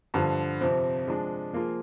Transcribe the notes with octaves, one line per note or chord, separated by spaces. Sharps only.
G2 D3 F3
F2 C3 F3 C4
F3 G#3 D4
F3 A#3 F4 G#4